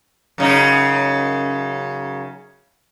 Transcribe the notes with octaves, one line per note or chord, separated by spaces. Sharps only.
F#2 C#3 D#4